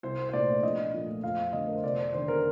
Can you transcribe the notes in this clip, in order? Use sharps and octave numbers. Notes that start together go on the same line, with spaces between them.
C2 C5
C5
A#2 A3 D5
A#1 D#5
A#2 F3 A3
F2 F5
D3 A3 D#5
A#4
C5
F1 D5
C5
D#2 D3 C5
A#4